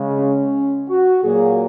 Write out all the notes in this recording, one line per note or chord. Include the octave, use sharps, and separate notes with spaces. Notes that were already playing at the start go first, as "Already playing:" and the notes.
Already playing: C#3 G#3
C#4
F#4
A#2 F#3 A#3 G#4